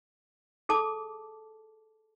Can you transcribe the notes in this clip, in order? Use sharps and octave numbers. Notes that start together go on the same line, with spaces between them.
G#4 A4 A5 D6